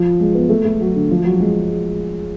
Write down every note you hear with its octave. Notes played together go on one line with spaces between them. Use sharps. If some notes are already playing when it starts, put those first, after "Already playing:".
Already playing: F3
G#3
B3
A3
A3
F#3
D3
F3
F#3
G#3